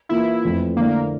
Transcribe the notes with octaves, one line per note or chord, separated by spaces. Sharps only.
E3 A#3 E4 F4
F2 E3 A3
D3 A3 A#3 E4 A#4 D5